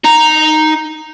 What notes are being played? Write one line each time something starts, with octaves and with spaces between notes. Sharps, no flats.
D#4 A#5